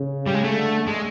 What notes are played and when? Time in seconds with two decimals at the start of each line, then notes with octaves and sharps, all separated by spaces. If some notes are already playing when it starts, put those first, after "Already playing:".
Already playing: C#3
0.27 G3
0.34 G#3
0.44 A3
0.53 D3
0.88 G#3